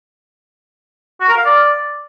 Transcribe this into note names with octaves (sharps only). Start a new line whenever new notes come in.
F#4
A#4
F5
D5